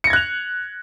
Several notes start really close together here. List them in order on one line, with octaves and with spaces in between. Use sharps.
C#7 A#6 G#6 F#6 F7